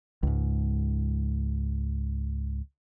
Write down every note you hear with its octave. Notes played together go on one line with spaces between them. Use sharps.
C#2 G#2